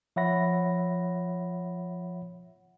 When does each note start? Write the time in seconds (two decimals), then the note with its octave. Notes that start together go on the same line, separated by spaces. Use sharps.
0.16 F3 C#5 E5 F#5 B5 A#6